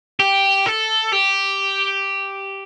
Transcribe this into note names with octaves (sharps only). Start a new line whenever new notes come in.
G4
A4
G4